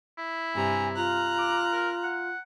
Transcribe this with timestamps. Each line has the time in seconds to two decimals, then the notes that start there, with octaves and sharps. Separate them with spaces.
0.18 E4
0.55 G2 C3 G#5 A#5
0.96 F4 A#5 F#6
1.38 D6
1.72 A#4
2.04 F#5